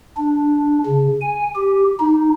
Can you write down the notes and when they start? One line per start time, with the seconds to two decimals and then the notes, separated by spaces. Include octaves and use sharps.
0.17 D4
0.87 C#3
1.21 G#5
1.56 G4
2.00 D#4